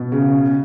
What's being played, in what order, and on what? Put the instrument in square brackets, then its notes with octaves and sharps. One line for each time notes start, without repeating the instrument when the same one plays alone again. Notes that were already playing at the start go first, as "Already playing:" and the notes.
Already playing: [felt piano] B2
C#3